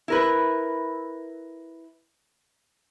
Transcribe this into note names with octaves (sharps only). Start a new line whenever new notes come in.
E4 A#4 B4